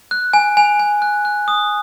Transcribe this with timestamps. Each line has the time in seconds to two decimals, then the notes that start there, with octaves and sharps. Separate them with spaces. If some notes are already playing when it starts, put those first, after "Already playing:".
0.11 F#6
0.33 G#5
0.57 G#5
0.80 G#5
1.02 F#6
1.25 F#6
1.48 D#6